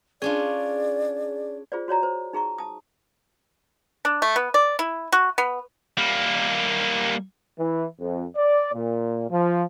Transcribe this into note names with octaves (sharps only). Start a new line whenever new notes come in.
C#4 D4 F4 G#4 D5
F4 G#4 C5 D5
F#4 C#5 D5 A#5
C5
D#4 G#4 A#5 C#6
A5 D#6
D4
A3
B3
D5
E4
F#4
B3
G3 A#3
E3
F2
D5
A#2
F3